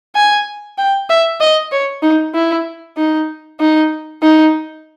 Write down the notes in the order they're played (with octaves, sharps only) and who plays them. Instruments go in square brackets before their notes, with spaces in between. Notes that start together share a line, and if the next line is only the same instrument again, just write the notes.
[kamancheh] G#5
G5
E5
D#5
C#5
D#4
E4
D#4
D#4
D#4